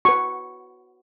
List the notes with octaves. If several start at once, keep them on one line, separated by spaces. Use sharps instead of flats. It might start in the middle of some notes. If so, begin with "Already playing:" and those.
F#4 B4 C#6